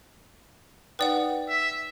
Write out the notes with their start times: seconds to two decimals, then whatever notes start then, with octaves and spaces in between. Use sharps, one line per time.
0.99 D#4 B4 D5 F#5 G5
1.49 E5